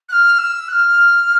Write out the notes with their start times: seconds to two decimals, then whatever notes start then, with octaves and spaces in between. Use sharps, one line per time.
0.09 F#6
0.12 F6
0.38 E6
0.68 F#6
0.72 F6